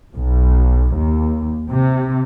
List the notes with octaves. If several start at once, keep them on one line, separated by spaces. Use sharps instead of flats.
B1
D#2
C3